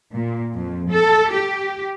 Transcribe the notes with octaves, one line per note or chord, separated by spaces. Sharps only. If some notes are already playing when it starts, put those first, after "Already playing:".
A#2
F2
A4
G4